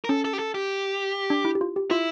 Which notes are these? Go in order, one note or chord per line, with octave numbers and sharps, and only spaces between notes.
A#4
C#4 A4
A4
G4
A4
G4
D4
E4
G4
F4
G4
E4 F4